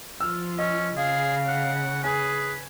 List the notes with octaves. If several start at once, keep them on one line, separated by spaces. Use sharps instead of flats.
F3 F4 E6 F6
C#4 D#5
C#3 G#4 F5
F#5
G#4 B4 G#5 G#6